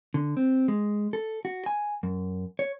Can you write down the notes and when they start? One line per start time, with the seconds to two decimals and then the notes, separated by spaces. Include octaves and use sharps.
0.14 D3
0.37 C4
0.68 G#3
1.13 A4
1.45 F#4
1.66 G#5
2.03 F#2
2.59 C#5